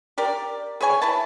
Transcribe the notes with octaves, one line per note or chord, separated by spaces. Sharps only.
G4 A#4 D5
G#4 B4 C#5 G#5
E4 B4 A5